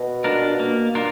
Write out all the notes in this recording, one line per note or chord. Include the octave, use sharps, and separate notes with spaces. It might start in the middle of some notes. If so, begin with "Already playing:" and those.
Already playing: B2
D4 F4 A#4
A#3
D4 F4 A#4